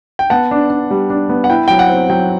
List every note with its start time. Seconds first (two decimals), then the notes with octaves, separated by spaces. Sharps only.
0.19 G5
0.30 B3 F#5 A5
0.51 D4
0.70 D4
0.91 G3
1.10 D4
1.29 B3
1.44 F#5
1.50 E4 G5
1.68 F#3 G5
1.79 F#5
1.89 C4
2.09 F#3 G5